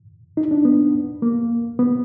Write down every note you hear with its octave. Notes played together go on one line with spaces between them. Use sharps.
D#4
D4
B3
A#3
B3